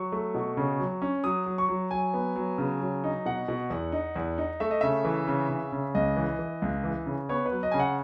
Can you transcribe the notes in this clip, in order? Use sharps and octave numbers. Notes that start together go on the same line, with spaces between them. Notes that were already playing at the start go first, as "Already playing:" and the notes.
Already playing: F#3 C#6
A3
B2
C#3
F#3
C#4
F#3 D#6
F#3
C#6
F#3
F#3 G#5
B3
F#3
C#3
F#3
D#4
B2 F#5
B2
E2
D#4
E2
D#4
A3 E5
D#5
C#3 E5
E3
C#3
C#3
C#3
C#2 D#5
E3
E3
C#2
E3
C#3
B3 C#5
B4
F#3
D#5
C#3 G#5
F#5